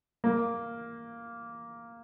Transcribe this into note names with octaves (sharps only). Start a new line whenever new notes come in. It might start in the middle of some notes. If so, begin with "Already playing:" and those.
A#3